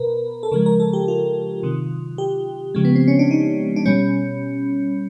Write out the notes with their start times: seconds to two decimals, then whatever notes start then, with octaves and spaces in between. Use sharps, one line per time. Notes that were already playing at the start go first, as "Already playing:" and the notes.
Already playing: B2 A#4 B4
0.43 A4
0.52 C#3 F3 G#3 A#4
0.66 A#4
0.80 A4
0.93 G4
1.08 F4
1.63 C3 D#3 F#3
2.18 G4
2.75 C#3 F3 G#3
2.85 B3
2.96 C4
3.08 C#4
3.19 D4
3.31 D#4
3.76 D4
3.85 B2 G3 C#4